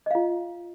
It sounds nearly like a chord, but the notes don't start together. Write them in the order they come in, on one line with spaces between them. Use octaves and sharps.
D#5 F5 F4